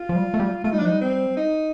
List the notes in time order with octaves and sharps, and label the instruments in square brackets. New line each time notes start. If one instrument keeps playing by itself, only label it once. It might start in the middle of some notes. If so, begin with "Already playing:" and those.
Already playing: [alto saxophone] F4
[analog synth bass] F3
G3
A3
G3
[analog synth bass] A3 [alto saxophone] F4
[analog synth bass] G3 [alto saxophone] D#4
[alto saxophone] D4
[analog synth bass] F3
[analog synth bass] G3 [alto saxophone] D#4
[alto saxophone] C4
D#4